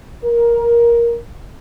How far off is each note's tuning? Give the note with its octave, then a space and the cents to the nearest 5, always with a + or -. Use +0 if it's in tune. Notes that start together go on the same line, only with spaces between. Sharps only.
A#4 +10